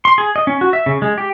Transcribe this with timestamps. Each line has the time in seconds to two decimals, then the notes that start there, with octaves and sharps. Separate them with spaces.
0.05 C6
0.18 G#4
0.36 D#5
0.47 C#4
0.61 F#4
0.73 E5
0.86 C#3
1.02 G#3
1.18 G4